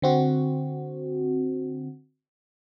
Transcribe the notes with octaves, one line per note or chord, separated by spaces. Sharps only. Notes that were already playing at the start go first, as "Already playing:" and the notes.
D3 C4 F#4